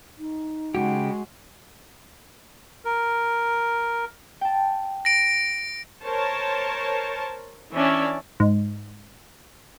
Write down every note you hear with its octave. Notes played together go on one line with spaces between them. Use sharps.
D#4
C#3 G#3 F#4 G4
A#4
G5 A5
A#6 D7
A#4 C5 C#5 A5
E3 C#4 D4 C#5 D5 E5
G#2